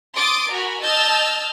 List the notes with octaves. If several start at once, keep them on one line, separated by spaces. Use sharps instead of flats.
C6 D6 D#6 A6 D7
F#4 A#4 G#5 B5
D#5 A5 E6 F6 G6 A6